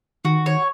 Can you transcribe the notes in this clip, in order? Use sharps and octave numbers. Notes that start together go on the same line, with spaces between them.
D#3 F#4
C#5